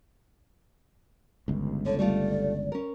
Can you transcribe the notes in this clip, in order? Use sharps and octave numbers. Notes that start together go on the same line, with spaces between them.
G1 C#2
D3 C#5
G3 A3 F4 D5
C#4 A#4